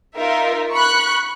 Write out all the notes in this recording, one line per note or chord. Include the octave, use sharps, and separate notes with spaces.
D#4 F4 A#4 E5
B5 C#6 F#6 C#7